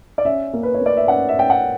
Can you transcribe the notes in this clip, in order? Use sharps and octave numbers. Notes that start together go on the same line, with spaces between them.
D5
C#4 E5
A#3
B4
C#5
A#3
D5
E5
C#4 F#5
E5
C#4 G5
F#5